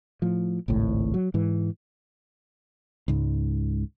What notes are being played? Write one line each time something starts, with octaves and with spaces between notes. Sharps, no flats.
A2 F3
G#1 C#2 A2
F#3
G#2 E3
C#2 G#2